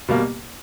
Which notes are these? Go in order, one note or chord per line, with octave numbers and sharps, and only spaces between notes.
B2 G3 A#3